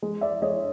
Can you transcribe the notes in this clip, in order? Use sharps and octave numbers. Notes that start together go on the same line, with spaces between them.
G#3
D5 E5
G#3 C#5 D#5